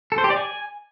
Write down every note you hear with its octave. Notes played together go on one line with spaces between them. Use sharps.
A4
C5
G4
D5
G#5